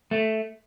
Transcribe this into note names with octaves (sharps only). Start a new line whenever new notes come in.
A3